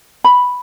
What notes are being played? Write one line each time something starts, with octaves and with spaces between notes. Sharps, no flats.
B5